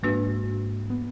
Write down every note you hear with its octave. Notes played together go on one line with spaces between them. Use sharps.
G#2 G#3 A#3 D4 F#4 B4
B3